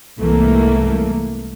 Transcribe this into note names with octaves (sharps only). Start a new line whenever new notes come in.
C2 G#2 E3 A3 A#3